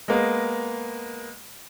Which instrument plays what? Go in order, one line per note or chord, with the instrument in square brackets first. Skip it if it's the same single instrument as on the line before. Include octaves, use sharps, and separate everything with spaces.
[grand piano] G#3 A#3 B3